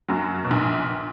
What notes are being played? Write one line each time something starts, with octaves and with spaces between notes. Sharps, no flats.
F#2 F#3
B2
A#1 A#2